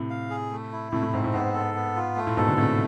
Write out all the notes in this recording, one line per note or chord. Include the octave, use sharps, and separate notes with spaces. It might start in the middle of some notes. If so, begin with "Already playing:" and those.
Already playing: A2 C3
F5
G#4
A3
E4
A2 C3 A3
A2
G#2 C4
A2
G#2 B3
A4
B3
F4
A3
A2
G#2 B2 A4
B2 D3
A2 C3 A3